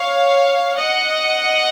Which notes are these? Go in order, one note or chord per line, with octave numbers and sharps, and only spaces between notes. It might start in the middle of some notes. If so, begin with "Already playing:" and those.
Already playing: C#5 F5
D#5 F#5